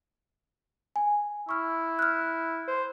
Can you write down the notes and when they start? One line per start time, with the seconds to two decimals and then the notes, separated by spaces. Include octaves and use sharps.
0.96 G#5
1.49 E4 C#6 F6
1.99 F6 F#6
2.68 C5